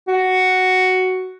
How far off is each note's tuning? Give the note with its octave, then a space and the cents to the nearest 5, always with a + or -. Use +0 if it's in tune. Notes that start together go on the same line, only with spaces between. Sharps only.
F#4 +5